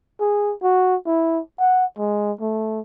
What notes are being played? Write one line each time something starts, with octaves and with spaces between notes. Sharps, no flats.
G#4
F#4
E4
F#5
G#3
A3